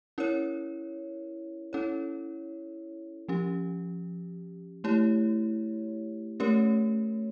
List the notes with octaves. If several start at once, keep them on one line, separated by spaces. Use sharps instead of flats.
C#4 E4 A#4 C#5
C#4 E4 A4 C#5
F3 C#4 G4
A3 E4 G4 C#5
A3 C#4 G4 A#4 C#5